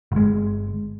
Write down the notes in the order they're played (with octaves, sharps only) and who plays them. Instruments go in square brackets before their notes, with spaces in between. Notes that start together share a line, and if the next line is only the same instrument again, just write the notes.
[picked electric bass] G1 G#3